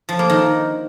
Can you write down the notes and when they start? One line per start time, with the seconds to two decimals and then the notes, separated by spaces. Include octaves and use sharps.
0.09 F3
0.19 A#3
0.30 D#3